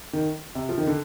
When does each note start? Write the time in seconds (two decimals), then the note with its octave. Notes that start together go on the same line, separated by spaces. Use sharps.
0.13 D#3
0.55 C3
0.69 F3
0.78 D#3
0.87 D3